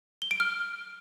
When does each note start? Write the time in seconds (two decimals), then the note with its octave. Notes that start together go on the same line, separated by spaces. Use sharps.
0.22 G7
0.31 D7
0.40 F6